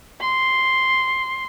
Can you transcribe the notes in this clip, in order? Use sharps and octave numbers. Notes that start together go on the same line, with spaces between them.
C6